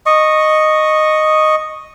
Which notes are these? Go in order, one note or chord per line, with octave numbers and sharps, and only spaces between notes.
D#5 C#6